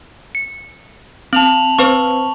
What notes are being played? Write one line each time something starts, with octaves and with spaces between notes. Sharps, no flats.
C#7
C4 A5 F7 F#7
C4 B4 C5 C#6